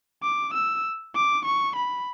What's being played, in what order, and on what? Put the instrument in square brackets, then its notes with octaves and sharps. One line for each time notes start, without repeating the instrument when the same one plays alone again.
[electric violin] D6
E6
D6
C#6
B5